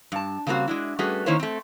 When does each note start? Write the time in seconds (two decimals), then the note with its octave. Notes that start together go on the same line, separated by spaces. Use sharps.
0.12 G2 A5
0.47 C#3 G3 A#3 C4 F#4
0.68 G#3 D4 E4
0.99 G3 A3 C#4 F#4 G#4 B4
1.26 D#3 A#3 C#4 E4 C5 C#5
1.40 A3 C4